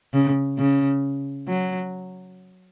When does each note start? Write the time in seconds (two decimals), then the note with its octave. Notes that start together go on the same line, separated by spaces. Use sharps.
0.14 C#3
0.58 C#3
1.48 F#3